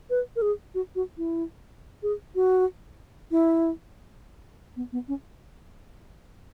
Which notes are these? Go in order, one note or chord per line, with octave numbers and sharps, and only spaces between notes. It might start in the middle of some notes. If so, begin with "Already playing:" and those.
B4
A#4
G#4
F#4
F#4
E4
G#4
F#4
E4
B3
B3
C#4